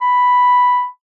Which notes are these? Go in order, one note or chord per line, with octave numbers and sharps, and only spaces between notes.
B5